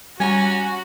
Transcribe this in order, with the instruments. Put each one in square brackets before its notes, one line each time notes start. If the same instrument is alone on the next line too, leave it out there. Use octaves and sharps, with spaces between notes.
[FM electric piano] G3 [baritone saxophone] C#4 [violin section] F#4 [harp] G#5 A#5